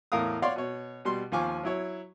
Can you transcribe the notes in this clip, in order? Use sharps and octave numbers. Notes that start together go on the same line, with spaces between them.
E2 A2 A#4 F5 D#6
C#5 D5 F5 F#5 C6
B2 C#5
B2 G3 C6
D#2 F3 F4 G#5 C#6 D6
F#3 E4 C#5